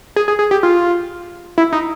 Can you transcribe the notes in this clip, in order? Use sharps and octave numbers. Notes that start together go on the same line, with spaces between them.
G#4
G#4
G#4
G4
F4
E4
D#4